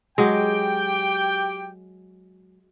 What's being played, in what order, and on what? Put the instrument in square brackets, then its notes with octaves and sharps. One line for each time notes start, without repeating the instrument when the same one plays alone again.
[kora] F#3 G#3 [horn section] G4 G5